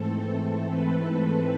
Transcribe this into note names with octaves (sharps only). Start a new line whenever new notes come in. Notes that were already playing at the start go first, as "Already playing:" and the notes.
Already playing: G#2 E3 A3 C4 A4
B4